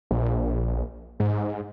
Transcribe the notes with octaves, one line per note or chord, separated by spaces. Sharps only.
A#1
G#2